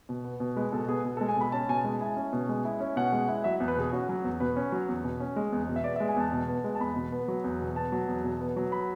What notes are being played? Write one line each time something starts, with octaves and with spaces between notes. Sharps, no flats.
B2
B3
B2
G#3 B4
B2 A4
B3 G#4
B2
A4
G#3
G#5
B2 B5
C#4 A5
B2 G#5
A5
G#3
E4 G#5
C#4
B2
G#3
E4
C#4
B2 F#5
G#3
E4
F#3 E5
E2
B4
B2 G#4
C#4 F#4
F#3
E2
B2 B4
C#4
F#3
E2
B2
C#4
G#3
E2
B2
E5
B3 D5
E5
G#3
G#5
E2 A5
B2
B3
G#3
A5
E2 B5
B2
B3
F#3
E2
B2
B3 A5
F#3
E2
B2
B3
F#3
B5